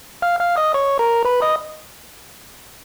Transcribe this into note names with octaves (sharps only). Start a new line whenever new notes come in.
F5 F6
F5 F6
D#5 D#6
C#5 C#6
A#4 A#5
B4 B5
D#5 D#6